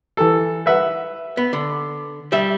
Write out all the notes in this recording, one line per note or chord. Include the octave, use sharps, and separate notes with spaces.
E3 A4
B4 E5 F#5
B3
D3
G3 E5